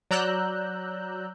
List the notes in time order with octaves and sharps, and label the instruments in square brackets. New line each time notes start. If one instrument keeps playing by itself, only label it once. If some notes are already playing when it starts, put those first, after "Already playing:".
[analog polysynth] F#3 D5 A#5 E6 F#6 G6